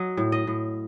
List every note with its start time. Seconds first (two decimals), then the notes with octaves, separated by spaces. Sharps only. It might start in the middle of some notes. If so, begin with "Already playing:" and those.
Already playing: F#3 D#5
0.17 A2
0.32 D#5
0.47 A2